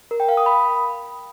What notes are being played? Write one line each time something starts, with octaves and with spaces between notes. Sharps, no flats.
A#4
G5
F5
D#6
B5